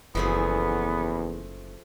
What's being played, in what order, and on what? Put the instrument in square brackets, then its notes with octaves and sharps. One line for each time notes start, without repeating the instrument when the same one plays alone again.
[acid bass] F#1 [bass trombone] E2 [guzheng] F3 A3 G#4 [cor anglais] B3